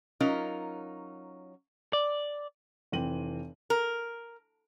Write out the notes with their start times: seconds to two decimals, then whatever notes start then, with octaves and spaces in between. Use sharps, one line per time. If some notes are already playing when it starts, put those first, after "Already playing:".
0.20 F#3 C#4 D#4 F4 A#4
1.93 D5
2.92 F1 E3 C4 D#7 F#7
3.70 A#4